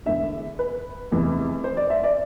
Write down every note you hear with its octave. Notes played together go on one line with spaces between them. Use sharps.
E1 E2 D3 E5
B4
F1 E2 C3 E3
C5
D5
E5
D5